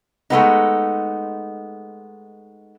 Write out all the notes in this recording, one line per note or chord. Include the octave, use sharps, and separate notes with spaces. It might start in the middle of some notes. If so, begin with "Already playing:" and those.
G#3 A3 B3 D#4